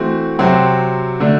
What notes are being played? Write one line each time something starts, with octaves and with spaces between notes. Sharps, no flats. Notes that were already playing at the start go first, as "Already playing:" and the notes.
Already playing: E3 A3 C4 F#4
C3 F#3 C4 F#4
D3 A3 D4